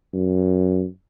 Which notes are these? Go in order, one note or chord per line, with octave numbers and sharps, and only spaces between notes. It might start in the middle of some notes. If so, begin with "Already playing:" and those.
F#2